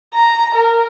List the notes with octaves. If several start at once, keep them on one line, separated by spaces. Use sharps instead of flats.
A#5
A#4